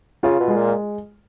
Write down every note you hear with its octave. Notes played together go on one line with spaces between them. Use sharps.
C#3 F4
B2
G#3
A#2